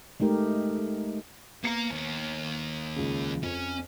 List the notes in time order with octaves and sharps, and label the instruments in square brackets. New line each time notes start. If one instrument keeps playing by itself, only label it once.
[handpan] G#3 A3 D#4 G4 A#4
[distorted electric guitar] A#3 A#5 [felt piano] B3 C#7
[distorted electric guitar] D#2
[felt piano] C#2 C#3
[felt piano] F2 [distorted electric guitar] C#4